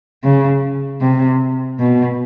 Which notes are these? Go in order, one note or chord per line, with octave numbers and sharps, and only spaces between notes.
C#3
C3
B2